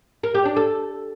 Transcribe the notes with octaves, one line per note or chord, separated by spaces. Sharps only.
A#4
G4
D4
A4